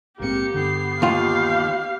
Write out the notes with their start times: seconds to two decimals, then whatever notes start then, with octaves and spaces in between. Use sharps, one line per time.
0.20 A#1 G#2 A#3 C4 G4 C#7
0.54 G2 D3 B3 C7
1.02 D#2 F4 G4 F5